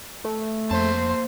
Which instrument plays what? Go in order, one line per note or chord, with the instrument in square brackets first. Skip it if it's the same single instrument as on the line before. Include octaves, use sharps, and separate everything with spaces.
[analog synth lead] A3
[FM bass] F2 [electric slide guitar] A#3 A5 [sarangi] C5